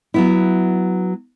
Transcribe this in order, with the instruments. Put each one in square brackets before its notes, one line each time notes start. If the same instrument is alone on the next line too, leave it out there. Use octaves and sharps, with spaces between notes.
[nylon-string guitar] F#3 B3 E4